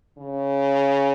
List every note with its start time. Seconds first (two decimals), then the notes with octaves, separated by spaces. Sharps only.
0.18 C#3